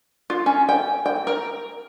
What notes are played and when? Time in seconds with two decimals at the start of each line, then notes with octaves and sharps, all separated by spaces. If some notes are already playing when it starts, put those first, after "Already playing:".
0.30 F4
0.46 C#4
0.69 G5
1.06 G5
1.27 A#4